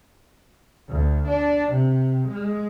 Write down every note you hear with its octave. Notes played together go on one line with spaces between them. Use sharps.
D2
D4
C3
G#3